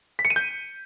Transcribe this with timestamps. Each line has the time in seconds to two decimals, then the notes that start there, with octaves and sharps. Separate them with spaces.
0.19 B6
0.25 C#7
0.30 D#7
0.36 G6